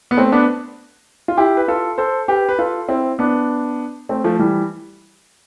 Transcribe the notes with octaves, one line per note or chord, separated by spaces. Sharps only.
B3
A3 C4
B3 D4
F4
E4 G4
B4
F4 A4
A4 C5
G4 B4
B4
F4 A4
C4 E4
B3 D4
A3 C4
F3 A3
E3 G3